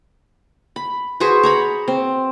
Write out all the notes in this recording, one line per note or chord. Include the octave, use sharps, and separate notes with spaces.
B5
F#4 G#4 B4 C5
C#5 A#5 B5
C4